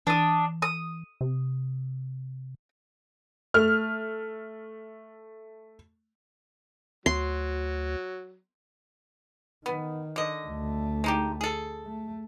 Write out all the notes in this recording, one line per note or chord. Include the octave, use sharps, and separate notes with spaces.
E3 D4 D#6
D#6
C3
A3 F6
D2 F#3 C6
D#3 B3
D3 D#5
D2 A3
G#3 D#4 G4
G#4 A4
A3